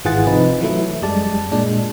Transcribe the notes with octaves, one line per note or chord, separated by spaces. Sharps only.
G#1 E3 F4 G#4 F#5 A6
C3 F3 D#4 B4
E3 F#3 A3 E4
F#2 G3 G#3 D5 A5
A#2 G#3 D4